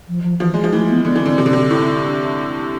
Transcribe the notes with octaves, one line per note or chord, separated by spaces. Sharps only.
F3
F3
E3 F3
G#3
F3
E3 A3
B3
D3 B3
E3
D3 C4
C3
D3
C3
A2
D4